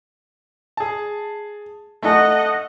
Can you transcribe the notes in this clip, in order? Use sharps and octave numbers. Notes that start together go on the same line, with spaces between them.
G#4 A5
A3 D#4 A4 D#5 F#5